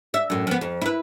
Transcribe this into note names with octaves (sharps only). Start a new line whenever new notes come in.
E5
F#2 A2
F3 B3
F2
E4 B4